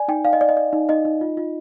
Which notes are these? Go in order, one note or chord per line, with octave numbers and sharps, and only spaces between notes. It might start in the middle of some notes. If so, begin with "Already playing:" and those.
Already playing: D5 G#5
D#4 G5
D5 F5
D#5
D5
D#5
D5
D#4
D#4 D#5
D#4
F4
F4